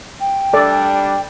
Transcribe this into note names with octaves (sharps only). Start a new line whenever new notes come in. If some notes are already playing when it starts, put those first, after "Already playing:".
G5
G3 D4 A4 D5